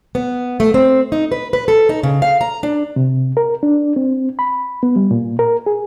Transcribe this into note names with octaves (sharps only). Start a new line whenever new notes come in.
B3
A3
C4
D#4
B4
B4
A4
D#4
C#3
F5
A#5
D4
C3
A#4
D4
C4
B5
B3
G3
A#2
A#4
G#4